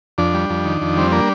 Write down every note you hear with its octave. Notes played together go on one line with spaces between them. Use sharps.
F2 D4
G3
F2
D#3
F2
G3 C4
A#3 D4